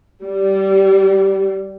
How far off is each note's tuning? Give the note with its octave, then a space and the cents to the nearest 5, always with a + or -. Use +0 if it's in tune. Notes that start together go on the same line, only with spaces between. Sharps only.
G3 -20